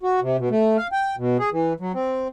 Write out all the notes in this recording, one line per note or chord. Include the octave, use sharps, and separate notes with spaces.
F#4
C3
B2
A3
F5
G5
B2
G#4
E3
F#3
C4